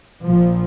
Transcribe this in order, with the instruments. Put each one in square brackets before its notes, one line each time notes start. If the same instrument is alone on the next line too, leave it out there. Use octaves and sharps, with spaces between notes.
[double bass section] A#1 A#2 F3